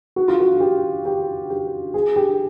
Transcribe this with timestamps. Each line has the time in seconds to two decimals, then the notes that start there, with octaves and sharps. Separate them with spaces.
0.16 F#4
0.28 F4
0.40 F#4
0.60 G4
1.05 G4
1.50 G4
1.94 G#4
2.16 G4